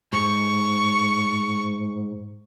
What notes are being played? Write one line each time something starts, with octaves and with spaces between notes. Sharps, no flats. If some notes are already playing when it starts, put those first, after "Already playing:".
G#2 C#6